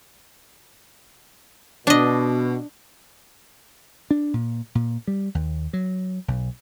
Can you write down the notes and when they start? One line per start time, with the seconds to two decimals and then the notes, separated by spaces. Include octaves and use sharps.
1.87 B2 D4 D#5
4.11 D4
4.34 A#2
4.75 A#2
5.07 G3
5.35 D#2
5.73 F#3
6.28 B1